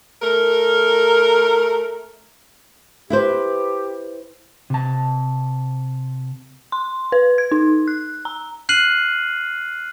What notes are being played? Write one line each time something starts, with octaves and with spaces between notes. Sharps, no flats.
A3 A#4
E4 G4 B4 C5
C3 A5
C6
B4
G#6
D#4
F#6
A#5
F6 F#6 C7 D#7 F#7